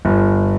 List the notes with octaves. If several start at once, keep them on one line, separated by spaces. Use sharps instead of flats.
G1